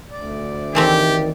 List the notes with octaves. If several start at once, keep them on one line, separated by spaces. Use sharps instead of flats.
D2 D5
D#3 E3 A3 C4 G4